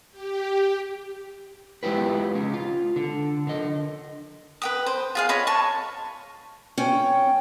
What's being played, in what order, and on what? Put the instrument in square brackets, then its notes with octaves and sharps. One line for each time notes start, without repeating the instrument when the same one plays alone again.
[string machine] G4
[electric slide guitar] G#3 E4 F4 G4 B4
G#3 C#4
F4
D3
D3 D#5
[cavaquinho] B4 G5 D#6
C5
F4 G#4 F5
C#5 D#5 B5 C6
A5 C#6
[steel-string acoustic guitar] C#4 G5